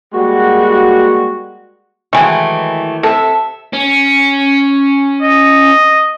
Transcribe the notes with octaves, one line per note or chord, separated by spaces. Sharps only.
G3 G#3 A#3 F#4
D#3 E3 F#3 G#3 A3
C3 A4 E5
C#4
D#5